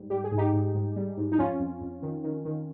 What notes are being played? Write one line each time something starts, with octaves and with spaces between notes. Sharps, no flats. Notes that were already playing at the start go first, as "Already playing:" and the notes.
Already playing: G#2 G3
G3 G4
G#4
G#2
D#4 G4
G#2
G#2
G3
G#2
D#4
F2 C#4 F4
F2
F2
D#3
D#3
D#3